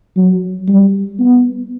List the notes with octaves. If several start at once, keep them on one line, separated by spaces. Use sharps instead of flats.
F#3
G3
B3